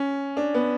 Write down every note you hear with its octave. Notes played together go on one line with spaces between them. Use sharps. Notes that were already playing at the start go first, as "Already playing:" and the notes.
Already playing: C#4
D4
B3